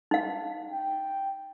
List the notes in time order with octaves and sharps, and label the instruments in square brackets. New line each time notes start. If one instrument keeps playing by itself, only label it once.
[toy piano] D#4 F5
[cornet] G5